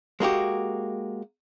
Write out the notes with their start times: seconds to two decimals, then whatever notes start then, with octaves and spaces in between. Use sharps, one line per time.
0.20 G#3 A#3 F#4 G4